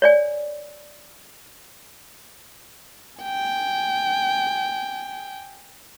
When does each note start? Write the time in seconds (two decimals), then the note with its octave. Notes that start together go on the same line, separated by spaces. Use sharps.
0.02 C#5 D5 G#5
3.21 G5 G#5